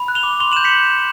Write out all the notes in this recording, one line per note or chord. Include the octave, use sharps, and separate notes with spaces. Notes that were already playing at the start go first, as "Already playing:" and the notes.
Already playing: B5
F#6
F7 G7
D6
C6 F7 G7
G6 E7 F#7
B6 C#7